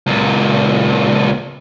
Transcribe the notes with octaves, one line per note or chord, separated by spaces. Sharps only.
C#2 A#2